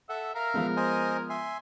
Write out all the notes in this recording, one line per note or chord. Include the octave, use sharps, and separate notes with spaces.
A4 E5 F#5
A#4 E5 F5 A#5
F3 G#3 B3
C5 D#5 G#5
E5 G#5 C6